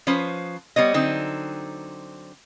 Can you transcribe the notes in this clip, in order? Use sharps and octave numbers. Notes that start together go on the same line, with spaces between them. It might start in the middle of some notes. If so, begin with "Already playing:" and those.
F3 C#4 B4 C5
G3 B3 C#5 D#5
D3 F#3 C4 D#4